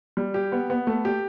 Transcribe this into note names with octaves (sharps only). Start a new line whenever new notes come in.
G3
G4
B3
B3
A3
G4